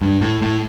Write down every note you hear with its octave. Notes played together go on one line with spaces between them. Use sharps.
G2
A2
A2